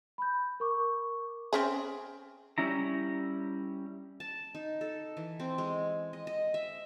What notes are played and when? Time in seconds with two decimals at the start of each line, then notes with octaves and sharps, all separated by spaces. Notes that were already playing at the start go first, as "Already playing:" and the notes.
0.18 B5 G6
0.60 A#4 C#6 D6
1.53 C4 C#4 G#4
2.58 G3 C#4 E4 A#5
4.20 A5
4.55 D#4
4.81 A4
5.17 E3
5.40 C4
5.58 G#3
6.13 D#5
6.27 D#5
6.54 E5